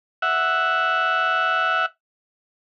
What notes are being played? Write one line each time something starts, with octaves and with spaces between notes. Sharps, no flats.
E5 F#5